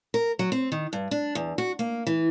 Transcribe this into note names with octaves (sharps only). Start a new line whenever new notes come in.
A#4
F#3
C4
D#3
G2
D4
E2
F#4
A#3
E3